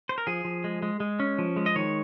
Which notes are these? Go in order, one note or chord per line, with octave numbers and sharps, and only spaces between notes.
C5
A#4
F3 G#4
F3
G#3
G#3
G#3
C#4
F3
G#3
D#5
D#3 C#5